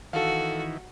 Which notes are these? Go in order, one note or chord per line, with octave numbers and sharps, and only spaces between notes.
D#3 E3 F#4 A4 F5